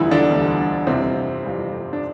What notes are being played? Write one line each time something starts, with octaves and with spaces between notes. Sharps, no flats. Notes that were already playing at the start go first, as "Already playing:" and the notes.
Already playing: E1 D2 D3 E3 F3 G3 E4
D3 D4
E1 D2 D3 G3
G1 F2 C3 E3 G3 C4
G1 F2 E3 G3
D4